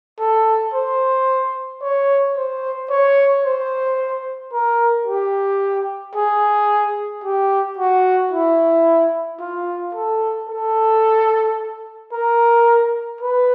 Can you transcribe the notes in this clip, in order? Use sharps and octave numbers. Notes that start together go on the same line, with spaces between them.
A4
C5
C#5
C5
C#5
C5
A#4
G4
G#4
G4
F#4
E4
F4
A4
A4
A#4
B4